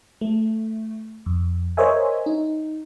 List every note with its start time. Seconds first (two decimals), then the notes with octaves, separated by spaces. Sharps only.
0.21 A3
1.26 F2
1.77 A#4 C5 C#5 D#5 E5 G#5
2.26 D#4